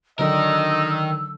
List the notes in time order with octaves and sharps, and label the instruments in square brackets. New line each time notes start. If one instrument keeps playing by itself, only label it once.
[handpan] D3 F#3 D4 [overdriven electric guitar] D#3 A#4 [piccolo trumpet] D#5 [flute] E6